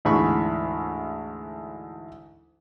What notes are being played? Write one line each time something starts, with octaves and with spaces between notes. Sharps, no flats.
D2 G#2 E3 B5 C#6